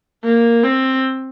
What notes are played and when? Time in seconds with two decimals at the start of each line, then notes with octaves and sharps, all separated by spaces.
0.24 A#3
0.63 C4